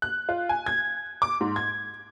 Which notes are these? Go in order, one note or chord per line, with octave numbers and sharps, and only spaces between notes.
F#6
F4
G#5
G#6
D6
G#2
G#6